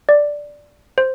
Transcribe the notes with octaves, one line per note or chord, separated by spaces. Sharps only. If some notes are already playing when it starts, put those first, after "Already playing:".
D5
C5